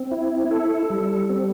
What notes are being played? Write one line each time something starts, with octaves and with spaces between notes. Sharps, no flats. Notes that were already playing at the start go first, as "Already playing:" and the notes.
Already playing: C4
E4
A4
G3
C4